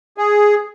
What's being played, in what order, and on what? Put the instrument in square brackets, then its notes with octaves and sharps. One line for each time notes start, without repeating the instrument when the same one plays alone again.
[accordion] G#4